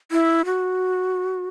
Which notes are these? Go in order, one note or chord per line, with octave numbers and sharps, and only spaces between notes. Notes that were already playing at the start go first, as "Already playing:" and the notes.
E4
F#4